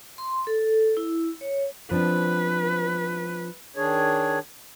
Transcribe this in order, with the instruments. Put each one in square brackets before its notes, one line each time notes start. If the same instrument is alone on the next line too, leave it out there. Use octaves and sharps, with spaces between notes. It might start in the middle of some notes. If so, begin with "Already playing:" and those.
[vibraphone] C6
A4
E4
C#5
[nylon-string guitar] F3 C4 D4 [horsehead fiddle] B4
[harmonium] D#3 D4 G#4 C#5